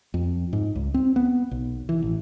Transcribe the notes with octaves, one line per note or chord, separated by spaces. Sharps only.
F2
G#2
C#2
C4
B3
B1
E3
A1